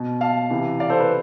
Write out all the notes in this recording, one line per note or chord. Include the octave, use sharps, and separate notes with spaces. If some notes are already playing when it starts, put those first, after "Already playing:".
Already playing: B2
F5 A5
C3 E3
D5 F5
A4 C5
B4